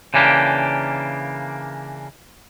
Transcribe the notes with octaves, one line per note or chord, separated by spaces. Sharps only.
C#3 E3 A#3 D4 G4